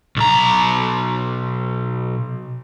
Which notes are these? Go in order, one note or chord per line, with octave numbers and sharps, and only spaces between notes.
B1 A#5